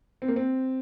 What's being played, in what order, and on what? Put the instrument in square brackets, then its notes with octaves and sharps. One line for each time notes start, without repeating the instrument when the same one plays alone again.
[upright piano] C4
A#3
C4